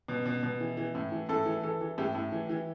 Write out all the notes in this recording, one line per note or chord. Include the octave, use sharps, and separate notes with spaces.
B2
B2
B2
E3
E3
A2
E3
A2 A4
E3
E3 A4
E3
A2 G4
A2
E3
E3